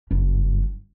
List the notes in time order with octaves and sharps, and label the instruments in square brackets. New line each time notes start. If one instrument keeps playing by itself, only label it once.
[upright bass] F#1 G2